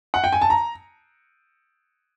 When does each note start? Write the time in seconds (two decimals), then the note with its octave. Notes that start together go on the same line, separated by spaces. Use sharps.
0.14 F#5
0.24 G5
0.32 G#5
0.41 A5
0.50 A#5